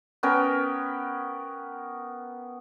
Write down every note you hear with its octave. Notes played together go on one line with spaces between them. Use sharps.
B3 C#4 A#4 G5